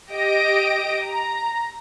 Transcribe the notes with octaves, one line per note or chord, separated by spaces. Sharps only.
G4 D#5 A#6 D7
A#5